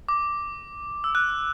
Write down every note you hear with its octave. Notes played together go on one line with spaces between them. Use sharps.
D6
E6
F#6